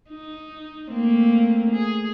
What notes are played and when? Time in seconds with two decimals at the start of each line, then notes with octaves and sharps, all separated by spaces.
0.10 D#4
0.92 A3 A#3 C4
1.71 G#4